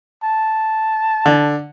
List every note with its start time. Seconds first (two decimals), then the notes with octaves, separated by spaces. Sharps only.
0.23 A5
1.26 D3